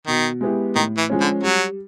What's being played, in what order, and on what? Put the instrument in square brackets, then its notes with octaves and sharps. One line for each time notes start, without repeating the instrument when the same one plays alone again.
[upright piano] B2 [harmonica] D#3
[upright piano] G#3 B3 E4 G4
[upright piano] A2 [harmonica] D#3
[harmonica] E3
[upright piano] F3 G#3 C#4
[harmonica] D3
[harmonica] F#3 [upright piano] G3